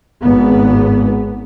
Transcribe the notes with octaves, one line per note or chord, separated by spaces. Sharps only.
G#1 B3